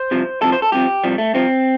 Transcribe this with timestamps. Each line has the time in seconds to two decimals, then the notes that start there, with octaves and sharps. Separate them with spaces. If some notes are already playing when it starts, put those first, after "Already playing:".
Already playing: C5
0.11 C2 C3 F3
0.41 C2 C3 F3 A4
0.52 C5
0.62 A4
0.72 C2 C3 F3 G4
1.04 C2 C3 F3 G3
1.18 A3
1.34 C2 C3 F3 C4